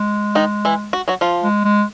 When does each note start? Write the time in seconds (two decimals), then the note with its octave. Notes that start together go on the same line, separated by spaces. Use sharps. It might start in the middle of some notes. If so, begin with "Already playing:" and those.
Already playing: G#3
0.35 D#3 D#4
0.65 E3 E4
0.93 F#4
1.08 F#3 F#4
1.21 F3 F4
1.43 G#3
1.65 G#3